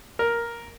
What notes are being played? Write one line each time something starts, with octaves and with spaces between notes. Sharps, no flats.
A#4